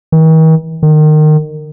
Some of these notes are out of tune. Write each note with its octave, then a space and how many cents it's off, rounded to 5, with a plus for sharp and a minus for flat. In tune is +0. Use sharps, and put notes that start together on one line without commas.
D#3 +45
D#3 -25